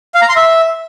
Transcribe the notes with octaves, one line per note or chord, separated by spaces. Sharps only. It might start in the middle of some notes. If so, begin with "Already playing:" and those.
F5
A#5
C6
E5